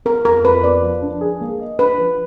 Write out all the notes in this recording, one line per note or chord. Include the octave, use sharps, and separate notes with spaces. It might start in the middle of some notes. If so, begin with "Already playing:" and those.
B3 A#4
F2 A#4
F2 B4
B3 D5
F3
D4
G#4
A#3
D#5
D4 B4
F3